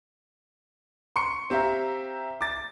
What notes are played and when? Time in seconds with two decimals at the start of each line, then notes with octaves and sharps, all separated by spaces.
1.16 C6 C#6 C#7
1.50 C4 G4 E5 F5 A#5
2.41 D6 A6